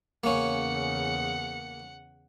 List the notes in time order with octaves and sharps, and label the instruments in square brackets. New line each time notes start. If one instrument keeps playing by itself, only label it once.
[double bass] E2 C#3 [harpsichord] A#3 C#4 [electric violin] F#5 C#7